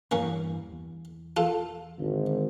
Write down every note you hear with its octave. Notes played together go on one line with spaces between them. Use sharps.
E2 G2 E3 A#3 C#4
E2
F4 A4
G#1 D3